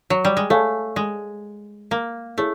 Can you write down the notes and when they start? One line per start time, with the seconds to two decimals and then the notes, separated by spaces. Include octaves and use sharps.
0.10 F#3
0.25 G3
0.37 G#3
0.50 A3 A4 C#5 F5 G#5
0.96 G#3
1.91 A#3
2.38 A3 E4 G#4 C#5